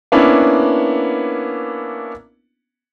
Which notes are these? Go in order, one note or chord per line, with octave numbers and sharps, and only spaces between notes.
A#3 B3 C#4 D4 E4